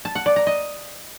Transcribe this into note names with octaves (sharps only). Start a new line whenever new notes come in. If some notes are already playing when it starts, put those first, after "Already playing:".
A5
F#5
D5
A#5
D#5